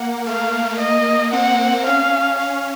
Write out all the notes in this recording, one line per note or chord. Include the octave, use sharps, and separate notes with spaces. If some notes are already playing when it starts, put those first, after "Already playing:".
Already playing: A#3 F#5
A3 F5
A#3 D#5
C4 F#5
C#4 F5
C#4 F5